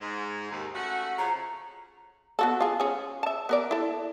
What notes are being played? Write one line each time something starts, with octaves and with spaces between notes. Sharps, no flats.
G#2
D#2
A3 C#4 F#4
F2 C#3 A#5
B3 F#4 A4
F4 G#4
C#4 G#4
E5 A5
B3 A#4 D5
E4 A4